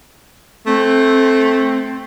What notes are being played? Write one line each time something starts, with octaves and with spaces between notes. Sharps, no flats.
A3 C4